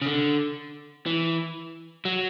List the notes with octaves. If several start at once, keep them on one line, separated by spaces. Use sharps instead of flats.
C#3
D3
E3
F#3